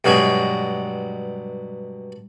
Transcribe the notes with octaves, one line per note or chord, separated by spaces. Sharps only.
G2 B2 F#3 G#3